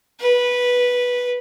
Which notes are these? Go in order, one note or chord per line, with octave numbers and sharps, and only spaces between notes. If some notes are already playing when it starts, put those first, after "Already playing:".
B4